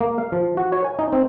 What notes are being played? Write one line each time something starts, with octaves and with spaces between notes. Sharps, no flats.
A#3
F5
F3
F#4
C#5
G#5
D#4
C4